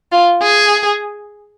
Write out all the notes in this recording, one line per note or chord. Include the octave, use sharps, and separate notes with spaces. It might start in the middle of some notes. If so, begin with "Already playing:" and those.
F4
G#4